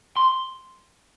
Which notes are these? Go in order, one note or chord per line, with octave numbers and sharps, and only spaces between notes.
C6